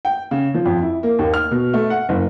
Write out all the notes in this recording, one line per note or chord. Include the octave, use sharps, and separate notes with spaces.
G5
C#3
F3
F2
E4
A#3
D#2
F6
B2
A3
F#5
F#1